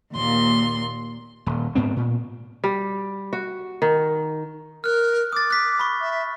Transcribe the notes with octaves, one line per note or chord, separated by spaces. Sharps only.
D#2 A#2 C6
D#1
G#2 B3 C4
A#2
G3
F#4
D#3
A#4 F6 F#6
D6 D#6 A6
F#6 B6
B5 C#6
E5